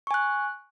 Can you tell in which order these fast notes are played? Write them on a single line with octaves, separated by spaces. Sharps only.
C#6 G#5 F#6